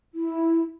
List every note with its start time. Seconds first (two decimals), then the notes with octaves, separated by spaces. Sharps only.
0.13 E4